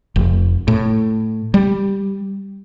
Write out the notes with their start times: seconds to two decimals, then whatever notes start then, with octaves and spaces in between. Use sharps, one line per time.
0.16 F1
0.68 A2
1.54 G3